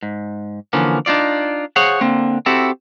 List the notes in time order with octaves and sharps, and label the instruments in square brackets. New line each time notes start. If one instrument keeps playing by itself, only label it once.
[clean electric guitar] G#2
D3 E3 F3 A#3 C#4
D4 D#4 F4 D5
G#4 C5 C#5 F5 F#5
D3 A#3 C4
C4 E4 F#4 G4 A4